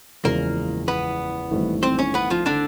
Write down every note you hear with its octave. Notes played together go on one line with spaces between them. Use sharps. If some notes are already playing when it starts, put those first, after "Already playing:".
F#1 E2 C#3 F3 G#3 A#3 A#4
B3 B4
G#1 G2 E3 A3
C4 C5
C#4 C#5
B3 B4
F3 F4
D3 D4